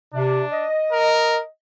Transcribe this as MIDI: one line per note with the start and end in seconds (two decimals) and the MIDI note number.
0.13 0.43 48
0.13 0.66 62
0.52 1.45 75
0.92 1.40 70